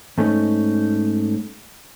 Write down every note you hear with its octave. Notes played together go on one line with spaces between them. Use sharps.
G#2 A3 C#4 D#4